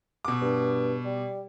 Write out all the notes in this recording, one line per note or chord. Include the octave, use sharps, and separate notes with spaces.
B2 D6
G2
G3